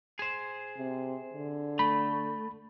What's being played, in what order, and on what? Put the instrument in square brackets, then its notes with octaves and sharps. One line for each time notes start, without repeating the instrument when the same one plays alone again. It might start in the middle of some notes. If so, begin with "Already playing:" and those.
[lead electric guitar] G#4 C5
[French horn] C3
D3
[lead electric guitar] A3 [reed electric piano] B5